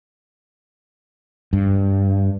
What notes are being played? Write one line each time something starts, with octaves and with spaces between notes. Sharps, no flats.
G2